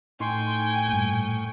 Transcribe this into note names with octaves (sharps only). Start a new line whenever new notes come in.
A2 D#4 G5 G#5 C6 C#6
G2 A#2